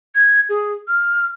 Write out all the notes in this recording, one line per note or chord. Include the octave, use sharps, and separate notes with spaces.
G#6
G#4
F6